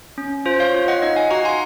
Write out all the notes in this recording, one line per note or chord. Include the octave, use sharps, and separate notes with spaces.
C#4
F4 C5
C#5 F5
F4
D#5 F#5
D#4 D#5 F#5
F5 G#5
F#4 F#5 A#5
G#5 C6